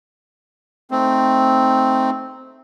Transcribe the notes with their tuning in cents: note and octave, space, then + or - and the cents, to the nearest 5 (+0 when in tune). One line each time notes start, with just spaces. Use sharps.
A3 +0 C4 +0 D#4 +0